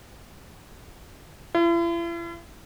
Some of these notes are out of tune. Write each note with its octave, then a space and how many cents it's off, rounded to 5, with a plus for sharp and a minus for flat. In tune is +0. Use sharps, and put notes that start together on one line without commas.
E4 +45